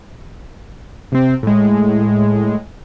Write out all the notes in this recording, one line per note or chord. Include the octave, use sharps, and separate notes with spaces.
C3 C4
A2 G#3